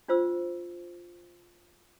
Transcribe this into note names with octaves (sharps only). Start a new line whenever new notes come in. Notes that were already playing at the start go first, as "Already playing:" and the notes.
D4 F4 C5 E6